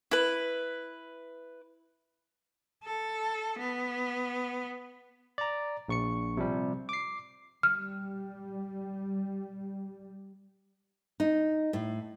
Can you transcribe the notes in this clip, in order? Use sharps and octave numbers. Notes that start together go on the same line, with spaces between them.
E4 B4
A4
B3
D5 A#5
A#1 C#6 C#7
C3 F3 G3
D6 C7
G3 F6
D#4
A2